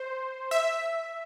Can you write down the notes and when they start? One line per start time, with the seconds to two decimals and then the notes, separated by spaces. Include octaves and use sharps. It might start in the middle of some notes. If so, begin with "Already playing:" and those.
Already playing: C5
0.51 E5